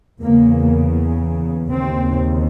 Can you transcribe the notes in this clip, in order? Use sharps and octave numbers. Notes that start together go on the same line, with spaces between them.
E2 C#3 A#3
D#2 C#3 C4